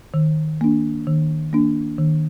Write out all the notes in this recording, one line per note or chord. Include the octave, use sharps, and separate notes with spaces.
D#3
A#3 D4
D#3
A#3 D4
D#3